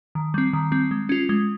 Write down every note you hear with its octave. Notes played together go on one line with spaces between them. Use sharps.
D#3
G3 C4
D#3
G3 C4
G#3
C#4 F4
G#3